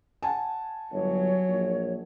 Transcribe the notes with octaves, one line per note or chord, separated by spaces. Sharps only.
F#5 G#5 A5
G1 F#3 C#5
A#1